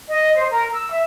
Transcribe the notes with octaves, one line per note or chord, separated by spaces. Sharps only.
D#5
C5
A#4
E6
E5